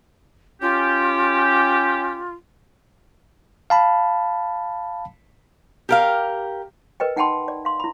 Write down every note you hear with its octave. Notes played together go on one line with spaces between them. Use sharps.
C#4 F4 G4
F5 A5 B5
G4 A#4 F5
A#4 B4 D#5 G5
D#4 F#5 G5 A5 B5 C6
D5
F5 C6
E4 B5